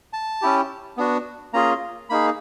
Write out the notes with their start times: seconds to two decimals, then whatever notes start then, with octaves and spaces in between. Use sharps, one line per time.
0.13 A5
0.42 C#4 E4 G4
0.97 B3 D4 F#4
1.53 A#3 C#4 F4 G#4 A#5
2.09 A#3 D#4 G#4 B5